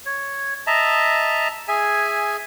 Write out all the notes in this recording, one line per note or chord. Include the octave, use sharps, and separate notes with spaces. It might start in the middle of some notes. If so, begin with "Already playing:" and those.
C#5
D#5 E5 A5 A#5
G#4 E5 G#5